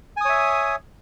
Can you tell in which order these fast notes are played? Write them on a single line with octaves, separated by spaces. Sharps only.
G#5 D#6 C#5 E5